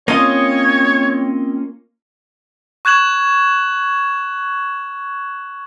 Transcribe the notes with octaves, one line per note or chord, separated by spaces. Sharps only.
A#3 C4 C#4 F4 C#5 D#5
C#6 F#6 G#6 E7 F#7